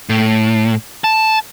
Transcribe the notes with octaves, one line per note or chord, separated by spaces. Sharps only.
A2
A5